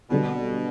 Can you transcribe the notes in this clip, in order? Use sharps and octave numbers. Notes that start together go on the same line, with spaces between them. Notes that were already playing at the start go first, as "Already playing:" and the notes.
B2 D3 G3 B3 F#4